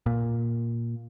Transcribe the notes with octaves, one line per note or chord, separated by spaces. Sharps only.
A#2